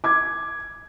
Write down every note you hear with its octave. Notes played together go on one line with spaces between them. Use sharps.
D6 G#6